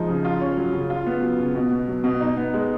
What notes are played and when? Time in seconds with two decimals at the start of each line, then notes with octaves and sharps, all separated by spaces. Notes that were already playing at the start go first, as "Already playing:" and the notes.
Already playing: F3 G#3 D#4
0.09 C#3
0.25 F4
0.41 C#4
0.57 F#3
0.73 C#3
0.90 F4
1.07 B3
1.22 F#3
1.39 C#3
1.55 B2
1.72 B3
1.88 F#3
2.04 B2
2.21 D#4
2.37 B3
2.53 G#3